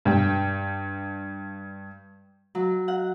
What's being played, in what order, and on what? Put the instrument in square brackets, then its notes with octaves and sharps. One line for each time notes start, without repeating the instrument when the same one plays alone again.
[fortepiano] G2 G5
[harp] F#3
F#5